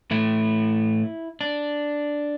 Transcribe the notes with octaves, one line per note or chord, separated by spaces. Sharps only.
A2 E3 A3 E4
D4